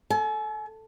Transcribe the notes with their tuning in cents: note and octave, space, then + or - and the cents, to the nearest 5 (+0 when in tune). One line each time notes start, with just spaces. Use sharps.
A4 +0 G#5 +45